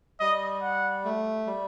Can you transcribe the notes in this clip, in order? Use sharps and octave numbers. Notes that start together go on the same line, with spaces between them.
G3 D#5
F#5
A3
G3